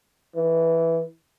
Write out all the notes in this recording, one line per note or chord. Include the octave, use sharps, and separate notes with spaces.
E3